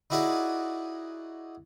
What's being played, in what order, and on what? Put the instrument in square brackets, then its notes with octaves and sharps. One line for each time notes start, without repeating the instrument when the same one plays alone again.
[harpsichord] D#4 E4 F#4 G#4 D5